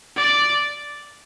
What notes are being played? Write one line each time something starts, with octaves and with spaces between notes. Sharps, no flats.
D5